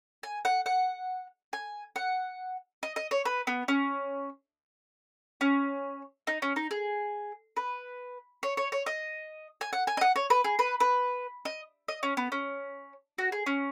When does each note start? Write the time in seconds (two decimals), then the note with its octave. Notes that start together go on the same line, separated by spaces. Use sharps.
0.23 G#5
0.45 F#5
0.66 F#5
1.53 G#5
1.96 F#5
2.83 D#5
2.96 D#5
3.11 C#5
3.25 B4
3.47 B3
3.68 C#4
5.41 C#4
6.27 D#4
6.42 C#4
6.56 D#4
6.71 G#4
7.57 B4
8.43 C#5
8.57 C#5
8.72 C#5
8.86 D#5
9.61 G#5
9.73 F#5
9.87 G#5
9.97 D#5
10.01 F#5
10.16 C#5
10.30 B4
10.44 G#4
10.59 B4
10.80 B4
11.45 D#5
11.88 D#5
12.03 C#4
12.17 B3
12.32 C#4
13.18 F#4
13.32 G#4
13.46 C#4